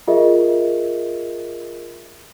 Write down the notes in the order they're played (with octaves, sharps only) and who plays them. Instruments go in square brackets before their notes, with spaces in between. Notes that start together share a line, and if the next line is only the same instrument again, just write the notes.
[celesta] F4 G#4 A#4 D#5 E5